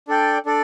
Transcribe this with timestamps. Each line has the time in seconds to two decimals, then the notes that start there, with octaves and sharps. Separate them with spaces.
0.08 D4 A4 D5 G5
0.46 D4 A4 D5